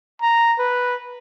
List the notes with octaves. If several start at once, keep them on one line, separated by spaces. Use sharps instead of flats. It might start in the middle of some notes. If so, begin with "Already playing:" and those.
A#5
B4